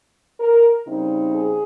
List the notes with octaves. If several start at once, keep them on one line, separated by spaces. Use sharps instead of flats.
A#4
C#3 G3 C4 D#4
G#4